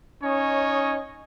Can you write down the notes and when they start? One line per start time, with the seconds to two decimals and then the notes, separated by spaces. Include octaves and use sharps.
0.23 C#4 D#4 C#5 D#5